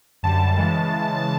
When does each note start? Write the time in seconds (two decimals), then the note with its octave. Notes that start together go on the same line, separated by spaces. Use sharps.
0.23 F#2 D3 G3 A5
0.58 C#3 E3 G#3